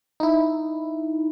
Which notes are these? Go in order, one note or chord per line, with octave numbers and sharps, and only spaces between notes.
D#4 E4